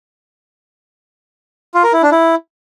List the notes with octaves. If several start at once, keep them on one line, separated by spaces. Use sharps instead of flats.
F4
A#4
E4
D4
E4